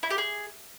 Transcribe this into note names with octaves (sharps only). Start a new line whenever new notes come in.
E4
G4
G#4